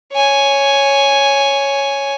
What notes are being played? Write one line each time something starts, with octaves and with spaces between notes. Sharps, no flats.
C#5 G#5